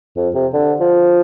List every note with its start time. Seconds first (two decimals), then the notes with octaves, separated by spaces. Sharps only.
0.16 F2
0.34 C3
0.53 D3
0.80 F3